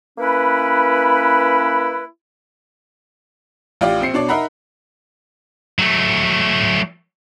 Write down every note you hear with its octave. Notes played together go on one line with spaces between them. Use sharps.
A#3 C#4 E4 B4
A1 F4 G4 D5 F5
A#1 C4 C7 C#7
B2 D4 C#5 D5
D#4 A#4 E5 F#5 A#5 B5
F#3 A3